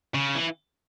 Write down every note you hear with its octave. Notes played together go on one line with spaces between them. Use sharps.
C#3
E3